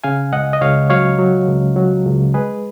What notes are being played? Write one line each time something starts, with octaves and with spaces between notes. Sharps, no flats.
C#3 F5 G#5
C#2 D#5 F#5
D#5
C#2 C#5 F5
F#3 C#5 F5
F#3
C#2
F#3
C#2
G#3 G#4 B4